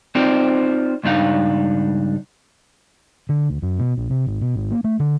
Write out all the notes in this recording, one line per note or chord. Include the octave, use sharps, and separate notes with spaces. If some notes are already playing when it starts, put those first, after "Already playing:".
C4 D#4 F4 C5 D5
C#2 G2 D4 D#4 F5
D3
D2
F#2
B2
A#1
C3
G#1
B2
G#1
A#3
A3
D3